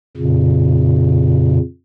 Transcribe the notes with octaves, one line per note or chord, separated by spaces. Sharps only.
F2 A#2 C#3